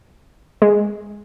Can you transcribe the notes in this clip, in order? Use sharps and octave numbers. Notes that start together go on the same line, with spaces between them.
G#3